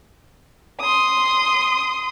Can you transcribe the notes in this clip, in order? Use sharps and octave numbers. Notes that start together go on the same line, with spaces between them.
C6 D#6